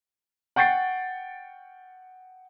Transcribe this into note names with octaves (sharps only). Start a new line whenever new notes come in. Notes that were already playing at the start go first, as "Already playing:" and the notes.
F#5 G5 C#6 A6 C7